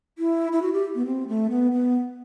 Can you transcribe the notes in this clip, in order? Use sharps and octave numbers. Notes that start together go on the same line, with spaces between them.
E4
E4
F#4
G4
B3
C4
A3
B3
B3